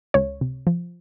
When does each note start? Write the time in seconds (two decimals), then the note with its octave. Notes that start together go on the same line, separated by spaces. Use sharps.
0.14 C#2 C#5
0.41 C3
0.67 F3